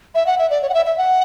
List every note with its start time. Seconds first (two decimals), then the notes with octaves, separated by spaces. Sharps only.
0.15 E5
0.27 F#5
0.38 E5
0.50 D5
0.62 C#5
0.69 F#5
0.74 E5
0.86 E5
0.98 F#5